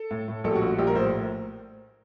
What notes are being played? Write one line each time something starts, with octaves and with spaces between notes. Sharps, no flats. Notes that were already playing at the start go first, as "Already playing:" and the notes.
Already playing: A4
A2
A2
A#1 A4
G4
F#4
A#1
F#4
A#1 G4
A#4
A2 C5